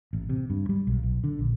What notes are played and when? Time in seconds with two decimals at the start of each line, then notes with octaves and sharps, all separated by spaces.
0.13 A1
0.29 C3
0.50 G2
0.69 G3
0.87 B1
1.03 B1
1.24 D3
1.39 A#1